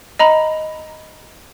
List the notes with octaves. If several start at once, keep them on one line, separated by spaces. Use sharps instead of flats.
D#5 A#5 B5